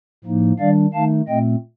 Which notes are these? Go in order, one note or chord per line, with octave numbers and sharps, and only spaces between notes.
A2 F3 A#3 D#4
D#3 G3 D4 D5 F5
D#3 A3 D#4 F5 A5
A#2 A3 C4 D#5 G5